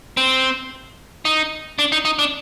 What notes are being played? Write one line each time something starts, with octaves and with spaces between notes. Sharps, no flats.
C4
D#4
D4
D#4
D#4
D4